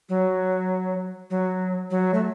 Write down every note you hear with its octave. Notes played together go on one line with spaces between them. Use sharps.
F#3
F#3
F#3
A3